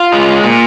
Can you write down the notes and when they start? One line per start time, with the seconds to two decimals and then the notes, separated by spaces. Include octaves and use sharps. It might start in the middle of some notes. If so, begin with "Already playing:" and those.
Already playing: F4 F5
0.12 G#3
0.44 A#2